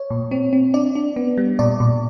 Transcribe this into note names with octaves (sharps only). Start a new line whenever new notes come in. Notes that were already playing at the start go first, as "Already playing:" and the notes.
Already playing: C#5
A#2
C4
C4
D4 D5
D4
B3
G3
A#2 D5
A#2